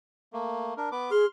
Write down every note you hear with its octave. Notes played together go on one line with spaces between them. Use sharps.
A3 A#3
D4 A#4
B3 B4 D6
G#4 C6 F6